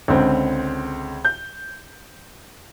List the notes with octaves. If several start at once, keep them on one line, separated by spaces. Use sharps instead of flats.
C#2 D3 C4
G6